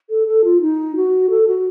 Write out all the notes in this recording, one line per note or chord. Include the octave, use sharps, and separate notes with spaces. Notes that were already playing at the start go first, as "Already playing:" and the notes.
A4
A4
F4
D#4
F#4
A4
F#4